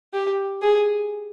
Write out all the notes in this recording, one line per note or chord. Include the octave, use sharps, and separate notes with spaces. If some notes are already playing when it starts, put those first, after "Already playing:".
G4
G#4